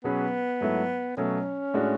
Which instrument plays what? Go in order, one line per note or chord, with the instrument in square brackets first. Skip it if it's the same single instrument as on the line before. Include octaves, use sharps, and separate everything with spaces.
[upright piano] B2 F#3 C#4 G#4 B4 [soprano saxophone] B3
[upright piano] G#2 F#3 A3 E4
[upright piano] B2 F#3 A3 [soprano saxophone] C#4
[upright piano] A2 G#3 D4 F#4